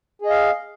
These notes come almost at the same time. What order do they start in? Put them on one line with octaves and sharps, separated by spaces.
G#4 D#5 F5